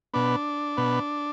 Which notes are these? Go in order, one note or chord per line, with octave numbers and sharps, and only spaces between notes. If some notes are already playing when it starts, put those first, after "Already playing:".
B2 B3 D4
B2 B3